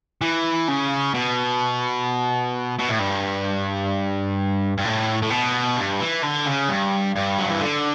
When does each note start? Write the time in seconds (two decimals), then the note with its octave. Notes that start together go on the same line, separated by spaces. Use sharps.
0.21 E3
0.68 C#3
1.14 B2
2.79 B2
2.89 A2
2.99 G2
4.78 G2
4.85 A2
5.22 A2
5.30 B2
5.77 G2
6.00 E3
6.23 D3
6.47 C#3
6.69 G2
7.16 G2
7.38 F#3
7.50 E3
7.61 D3